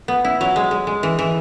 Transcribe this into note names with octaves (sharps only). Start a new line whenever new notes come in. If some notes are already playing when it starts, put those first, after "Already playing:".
B3
E4
F#3
G#3
G#3
G#3
E3
E3